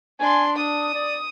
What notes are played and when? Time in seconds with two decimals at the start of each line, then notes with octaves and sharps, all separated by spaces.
0.20 D4 G#5 C6
0.56 D4 D#6
0.95 D5